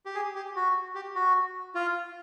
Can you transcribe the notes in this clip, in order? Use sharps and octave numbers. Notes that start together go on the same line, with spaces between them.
G4
G#4
G4
F#4
G4
F#4
F4